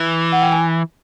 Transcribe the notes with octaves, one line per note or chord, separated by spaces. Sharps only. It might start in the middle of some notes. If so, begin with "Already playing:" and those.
Already playing: E3
F#5
G5
G#5